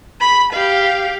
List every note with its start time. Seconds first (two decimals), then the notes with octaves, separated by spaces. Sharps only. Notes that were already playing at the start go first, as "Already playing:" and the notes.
0.21 B5
0.53 G4 F5